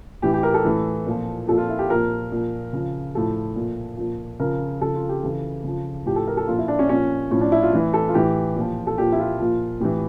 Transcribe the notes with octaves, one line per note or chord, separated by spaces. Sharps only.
A2 E3 G4
G4
A#4
A4
A2 E3
A#2 F3
A#2 F3 A4
F4
E4
G4
A#2 F3 A#4
A#2 F3
C#3 F3
A2 F3 A4
A#2 F3
A#2 F3
C#3 F3 A#4
C#3 F3 A4
F4
G4
C#3 E3 A4
C#3 F3
A2 F3 G4
A4
A#4
A4
A#2 F3 F4
E4
D4
C#4
A#2 F3 C#4
A2 F3 C#4
D4
E4
F4
A2 E3 E4
A4
F4
A2 E3 G4
A#2 F3
A4
A#2 F3 G4
E4
F4
A#2 F3
A2 E3 G4